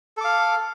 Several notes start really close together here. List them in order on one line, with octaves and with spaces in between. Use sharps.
A4 D6 F5